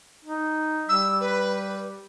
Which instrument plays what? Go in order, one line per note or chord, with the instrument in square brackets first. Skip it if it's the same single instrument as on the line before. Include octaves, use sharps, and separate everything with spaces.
[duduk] D#4
[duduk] G3 [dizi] E6
[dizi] B4